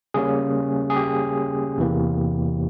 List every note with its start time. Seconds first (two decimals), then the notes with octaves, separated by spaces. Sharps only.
0.14 C#3 G3 A#3 C#4 G#4
0.90 G#4
0.96 G4
1.78 E2 C3 E3 A#3